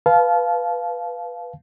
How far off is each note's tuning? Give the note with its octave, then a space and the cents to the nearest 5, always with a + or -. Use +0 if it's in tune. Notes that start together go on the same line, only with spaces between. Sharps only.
B4 -5 F5 +0 A5 -30